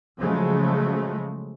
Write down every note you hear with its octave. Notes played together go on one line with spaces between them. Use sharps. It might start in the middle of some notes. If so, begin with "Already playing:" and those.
C#3 F3 F#3 G#3 A3